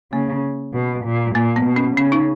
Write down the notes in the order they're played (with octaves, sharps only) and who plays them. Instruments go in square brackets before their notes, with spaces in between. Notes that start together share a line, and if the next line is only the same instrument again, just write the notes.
[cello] C#3 [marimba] A#3
[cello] B2
A#2
[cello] A#2 [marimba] A#3
[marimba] B3
[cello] B2
[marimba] C#4
[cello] C#3 [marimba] C#4
[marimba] D#4